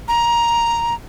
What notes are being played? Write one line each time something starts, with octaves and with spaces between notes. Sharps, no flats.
A#5